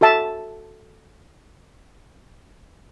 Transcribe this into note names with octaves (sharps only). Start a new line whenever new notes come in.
F#4 A4 E5 A5